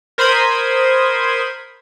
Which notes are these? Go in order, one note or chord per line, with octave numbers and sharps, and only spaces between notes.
A#4 C5 B5 C6 D#6 G#6